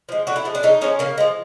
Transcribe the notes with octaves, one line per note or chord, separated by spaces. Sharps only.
F3 G#3
D3 F#4
E4
F3 G#3
D4
C#3 D#4
F3 G#3 C#4
C#3 A#3
F3 G#3